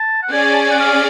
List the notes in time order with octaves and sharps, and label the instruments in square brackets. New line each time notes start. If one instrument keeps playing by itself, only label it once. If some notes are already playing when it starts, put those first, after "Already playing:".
Already playing: [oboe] A5
F#5
[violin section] C#4 G#4 D5 [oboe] G#5
[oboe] A5
G#5
F#5
F5